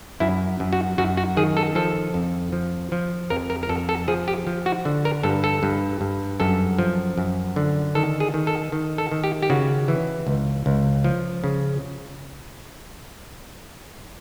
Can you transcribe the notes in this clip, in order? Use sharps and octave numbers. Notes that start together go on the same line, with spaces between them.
F#2 E4
F#2
F#4
F#2 F#4
F#4
D#3 G#4
A4
F3 A4
F2
F3
F3
F2 A#4
A#4
A#4
F2 A4
A4
F3 G#4
G4
F3
F#4
D3
A#4
G2 A4
A4
G2
G2
F#2 A4
F3
F#2
D3
D#3 A4
G#4
D#3
A4
D#3
A4
D#3
G4
G4
C#3 F#4
E3
C#2
C#2
F3
C#3